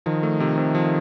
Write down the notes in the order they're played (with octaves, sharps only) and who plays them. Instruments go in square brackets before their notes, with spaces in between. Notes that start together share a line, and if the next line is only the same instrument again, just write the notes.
[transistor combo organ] D#3 [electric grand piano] F3
[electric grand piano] A3
C3
C3
F3